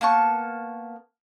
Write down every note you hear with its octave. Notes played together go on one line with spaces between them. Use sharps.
A#3 B3 A5 C#6